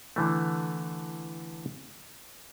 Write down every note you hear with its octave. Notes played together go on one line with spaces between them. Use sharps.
D3 E3 A3